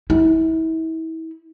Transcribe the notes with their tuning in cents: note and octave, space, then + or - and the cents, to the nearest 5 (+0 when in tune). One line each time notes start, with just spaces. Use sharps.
E4 -35